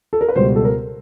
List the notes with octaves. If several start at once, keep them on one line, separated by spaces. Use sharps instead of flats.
A4
A#4
B4
C#2 B2 G3 C5
A4
A#4